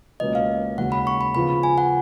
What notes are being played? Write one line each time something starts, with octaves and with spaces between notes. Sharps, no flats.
C#2 B2 A#3 C#4 D#5
F5
D#2 C#3 G#3 C#4 F#4 F#5
B5
C#6
B5
C#3 F3 B3 F4 B5
G#5
F#5